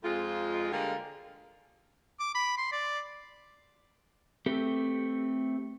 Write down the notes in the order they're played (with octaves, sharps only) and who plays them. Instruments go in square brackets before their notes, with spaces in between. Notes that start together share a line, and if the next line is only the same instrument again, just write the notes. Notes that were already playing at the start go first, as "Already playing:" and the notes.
[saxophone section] F2 G#3 F4
D3 G3 G#3 A#3 F4 A#4
[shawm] D6
B5
C6
D5
[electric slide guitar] A3 C4 G4 A4 B4